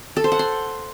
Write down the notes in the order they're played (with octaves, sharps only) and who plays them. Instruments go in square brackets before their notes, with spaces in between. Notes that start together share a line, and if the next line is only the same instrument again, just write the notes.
[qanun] A4
C5
F#5
C6